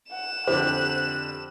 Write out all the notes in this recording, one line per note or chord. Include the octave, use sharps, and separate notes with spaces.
F#5 E7
F2 D3 G4 C5 F#6